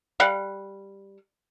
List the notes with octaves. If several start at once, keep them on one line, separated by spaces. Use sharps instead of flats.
G3 F5 F#5